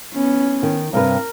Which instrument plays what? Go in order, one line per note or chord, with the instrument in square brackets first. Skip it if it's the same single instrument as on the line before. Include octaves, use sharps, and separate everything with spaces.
[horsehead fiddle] B3 C#4
[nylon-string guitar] D#3
[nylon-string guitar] G2 C3 B4 [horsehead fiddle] A#4